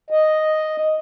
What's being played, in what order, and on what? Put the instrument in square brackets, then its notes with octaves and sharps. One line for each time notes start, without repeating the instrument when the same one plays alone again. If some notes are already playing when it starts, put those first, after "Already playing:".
[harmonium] D#5